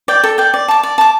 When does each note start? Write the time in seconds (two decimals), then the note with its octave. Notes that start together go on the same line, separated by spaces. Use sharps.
0.08 D5 G5
0.24 A4
0.38 D5 G5
0.54 D5
0.68 A5 D6
0.83 D5
0.98 A5 D6